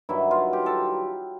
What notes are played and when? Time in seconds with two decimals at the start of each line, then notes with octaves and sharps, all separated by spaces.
0.09 G2 D#3 F#3 E4
0.31 F4
0.53 G4
0.66 A4